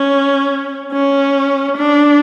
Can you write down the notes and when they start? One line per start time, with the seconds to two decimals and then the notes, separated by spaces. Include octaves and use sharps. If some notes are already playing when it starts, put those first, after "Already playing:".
Already playing: C#4
0.92 C#4
1.77 D4